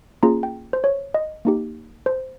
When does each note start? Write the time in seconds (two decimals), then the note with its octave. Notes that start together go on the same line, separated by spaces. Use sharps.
0.23 A#3 C#4 F4 G#4 A#5
0.43 G5
0.73 C5
0.84 C#5
1.14 D#5
1.45 A#3 D#4 G4
2.06 C5